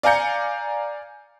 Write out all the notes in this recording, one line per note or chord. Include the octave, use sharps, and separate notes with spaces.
D5 F5 G#5 A#5 G6 C#7